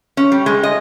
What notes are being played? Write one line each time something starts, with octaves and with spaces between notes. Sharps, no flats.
C#4
G3
G#3
D#5